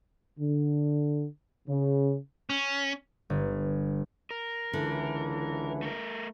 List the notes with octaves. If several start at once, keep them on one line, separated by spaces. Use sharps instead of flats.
D3
C#3
C#4
G1
A#4
C#2 D3 E3
A3 A#4